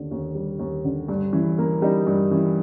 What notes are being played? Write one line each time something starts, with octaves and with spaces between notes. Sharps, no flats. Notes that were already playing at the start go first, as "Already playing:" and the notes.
Already playing: D#2 D3 D4
D#2
G3
D#2
D3
G2
E3
A#3
G3 D#4
G2
E3